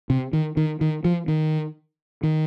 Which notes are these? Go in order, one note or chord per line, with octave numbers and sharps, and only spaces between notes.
C3
D#3
D#3
D#3
F3
D#3
D#3